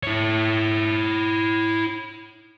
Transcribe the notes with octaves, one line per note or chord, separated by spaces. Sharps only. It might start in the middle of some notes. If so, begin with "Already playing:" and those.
E4 C#5